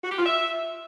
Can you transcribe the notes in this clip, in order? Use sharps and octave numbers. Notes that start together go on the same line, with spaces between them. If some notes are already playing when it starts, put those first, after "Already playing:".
F#4
G4
F4
E5